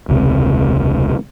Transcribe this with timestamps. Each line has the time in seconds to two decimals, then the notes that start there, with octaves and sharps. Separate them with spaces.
0.08 E1 C#2 C3